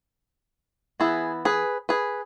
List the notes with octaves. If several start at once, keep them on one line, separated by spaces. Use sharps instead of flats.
E3 B3 E4 G#4
G#4 B4
G#4 B4